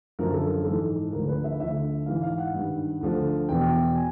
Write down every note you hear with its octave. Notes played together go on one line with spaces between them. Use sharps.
F#2 D3 F3 A#4
A4
A4
G#2 E3 A4
D2 D3 F3 A#4
B4
E5
D2 D3 F3 E5
G#2 E3 F5
F5
F#5
G2 D#3
D2 D3 F3
E2 B2 G5
G#5